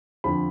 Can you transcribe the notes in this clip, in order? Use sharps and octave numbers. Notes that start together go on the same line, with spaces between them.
F2 D3 F3 B5